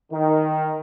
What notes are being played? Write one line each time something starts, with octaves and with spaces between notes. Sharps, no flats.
D#3